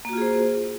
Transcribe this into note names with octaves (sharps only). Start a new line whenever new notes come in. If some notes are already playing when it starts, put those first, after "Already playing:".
A#3 F4 F#4 G#4 C5